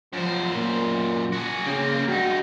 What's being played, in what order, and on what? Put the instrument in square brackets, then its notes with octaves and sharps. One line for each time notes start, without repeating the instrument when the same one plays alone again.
[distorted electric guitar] F#2 C5 [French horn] F3
[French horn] A#2
[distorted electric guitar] F#4 G#4
[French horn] C#3 [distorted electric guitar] A#3 C4
[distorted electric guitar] G2 D#4 [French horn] F#4